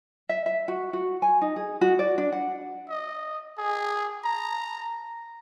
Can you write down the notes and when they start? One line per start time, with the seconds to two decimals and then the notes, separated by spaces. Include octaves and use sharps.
0.29 E5
0.46 E5
0.68 F#4
0.93 F#4
1.22 G#5
1.42 D#4
1.56 G#4
1.81 F#4
1.99 D5
2.18 D4
2.32 F#5
2.90 D#5
3.58 G#4
4.25 A#5